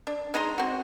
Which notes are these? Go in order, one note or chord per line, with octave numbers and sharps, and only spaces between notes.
D4
G#3 D#4 A#5 C6
C4 F#4